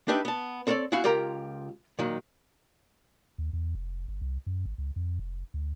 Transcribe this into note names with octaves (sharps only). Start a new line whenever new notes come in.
D4 D#4 G4 B4 E5
B3 A5
C4 A4 A#4 C#5 D5
B3 C#4 E4 F#4 F5 F#5
C#2 F4 G4 A#4 A#5
A#2 D#3 F#3
D#2
E2
F1
G1
C2
F#2
G#1
C#2
F2
F1
D2